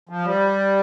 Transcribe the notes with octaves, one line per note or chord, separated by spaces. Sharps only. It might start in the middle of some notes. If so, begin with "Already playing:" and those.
F3
G3